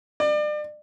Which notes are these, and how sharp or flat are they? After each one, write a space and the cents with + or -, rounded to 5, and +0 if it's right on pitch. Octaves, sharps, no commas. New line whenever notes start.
D5 +35